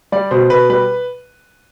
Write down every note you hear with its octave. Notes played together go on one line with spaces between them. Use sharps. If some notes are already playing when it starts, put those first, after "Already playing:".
G3 D5
B2 C5
B2 B4
G3 B4